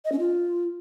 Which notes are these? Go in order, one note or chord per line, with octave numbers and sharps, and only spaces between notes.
D#5
C#4
F4